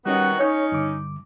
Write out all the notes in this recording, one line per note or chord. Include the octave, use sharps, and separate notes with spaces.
D#3 G3 B3 C#4 F#4 D#5
C#4 D#4 C#5
G2 D3 D6